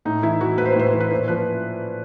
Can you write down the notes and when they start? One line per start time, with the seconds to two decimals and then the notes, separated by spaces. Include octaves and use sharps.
0.05 A2 D#4
0.23 E3 E4
0.41 E3 F#4
0.58 A2 B4
0.65 C5
0.72 B4
0.76 A2 C5
0.86 B4
0.93 E3 C5
1.00 B4
1.11 A#2 C5
1.28 F3 B4